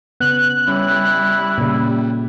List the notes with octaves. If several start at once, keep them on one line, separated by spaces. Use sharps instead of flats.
C#3 B3 F#6
G3 C#4 E4
A#2 C#3